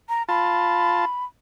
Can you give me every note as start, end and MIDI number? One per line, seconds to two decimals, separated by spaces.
0.09 0.23 82
0.29 1.05 65
0.29 1.05 81
0.29 1.24 83